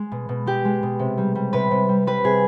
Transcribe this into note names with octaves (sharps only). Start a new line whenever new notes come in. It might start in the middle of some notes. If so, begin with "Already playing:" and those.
Already playing: G#3
B2
B2
G#3 G4
G#3
B2
C3
G3
G3
C3 B4
C3
G3
G3 B4
C3 G#4